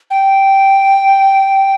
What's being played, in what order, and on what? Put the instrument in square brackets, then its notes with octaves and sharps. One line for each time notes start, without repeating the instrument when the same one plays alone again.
[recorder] G5